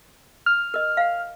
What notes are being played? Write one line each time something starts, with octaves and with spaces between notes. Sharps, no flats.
F6
A#4 D#5
F5 F#5